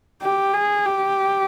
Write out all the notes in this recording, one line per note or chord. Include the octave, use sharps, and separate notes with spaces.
G4
G#4
G4